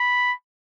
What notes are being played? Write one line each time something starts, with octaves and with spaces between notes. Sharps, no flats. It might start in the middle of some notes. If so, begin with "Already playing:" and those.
Already playing: B5